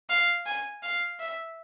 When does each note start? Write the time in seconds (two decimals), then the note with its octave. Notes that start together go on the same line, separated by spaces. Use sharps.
0.10 F5
0.46 G#5
0.82 F5
1.19 E5